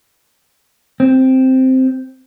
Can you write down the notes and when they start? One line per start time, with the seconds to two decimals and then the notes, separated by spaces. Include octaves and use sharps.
1.00 C4